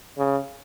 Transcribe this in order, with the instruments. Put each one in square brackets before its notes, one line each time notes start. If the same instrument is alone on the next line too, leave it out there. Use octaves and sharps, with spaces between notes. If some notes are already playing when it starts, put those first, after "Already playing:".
[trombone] C#3